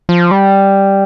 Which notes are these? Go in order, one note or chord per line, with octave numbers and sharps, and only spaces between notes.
F3
G3